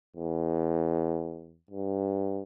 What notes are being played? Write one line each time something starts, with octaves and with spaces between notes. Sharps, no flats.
E2
G2